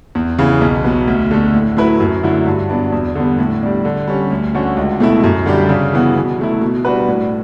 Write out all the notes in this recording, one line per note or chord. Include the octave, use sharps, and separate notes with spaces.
E2
C#3 E3 B3
B1
B2 F#3 B3
D2
D3 A3
A2
F#3 A3 E4 B4
F#2
D3 F#3 A3 E4
G2
F#3 B3 D4
E2
D3 G3 B3
A2
G3 D4
D3
G3 C#4
D2
D3 A3 C#4 F#4
C#2
B2 A3 E4
F#2
D3 G3 D4 G4
C#3
E3 B3 F#4
B2
F#3 A3 E4
B2
G3 D4 F#4 B4
A2